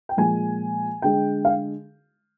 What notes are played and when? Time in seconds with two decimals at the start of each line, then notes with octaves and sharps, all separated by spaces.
0.09 G5
0.17 A#2 F3 G#3 G#5
1.02 D3 G#3 G5
1.45 F5